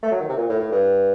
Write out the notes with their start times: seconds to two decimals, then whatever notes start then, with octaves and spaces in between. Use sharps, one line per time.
0.03 A3
0.11 F#3
0.20 D#3
0.29 C3
0.37 A#2
0.49 A2
0.59 A2
0.72 G2